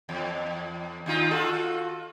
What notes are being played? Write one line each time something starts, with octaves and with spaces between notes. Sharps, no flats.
E2
D#2 D#4 F4
F4 F#4 A4